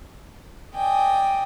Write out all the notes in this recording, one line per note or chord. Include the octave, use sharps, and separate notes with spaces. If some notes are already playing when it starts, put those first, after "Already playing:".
D5 D#5 G5 G#5